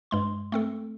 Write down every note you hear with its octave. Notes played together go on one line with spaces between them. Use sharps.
G2 G#3 C6
A3 C4 A4